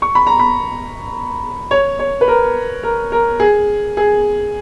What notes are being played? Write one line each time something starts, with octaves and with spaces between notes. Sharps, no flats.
C#6
B5
A#5
B5
C#5
C#5
B4
A#4
A#4
A#4
G#4
G#4